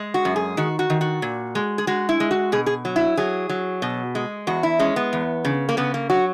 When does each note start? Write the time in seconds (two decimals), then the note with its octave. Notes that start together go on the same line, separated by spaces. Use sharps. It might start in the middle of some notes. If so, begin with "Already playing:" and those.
Already playing: G#3
0.14 F#4
0.25 F#2
0.36 G#4
0.57 D#3 F#4
0.79 F#4
0.90 D#3
1.01 F#4
1.22 A#2
1.55 G#3
1.78 G#4
1.87 G#3 F#4
2.09 E4
2.20 G#3
2.31 F#4
2.52 B2 G#4
2.66 G#4
2.85 F#3
2.96 E4
3.17 F#3 G#4
3.49 F#3
3.82 B2
4.15 G#3
4.47 E2 F#4
4.63 E4
4.79 G#3 C#4
4.96 B3
5.13 E2
5.45 C#3
5.69 A#3
5.77 C#3 B3
5.94 A#3
6.10 F#3 F#4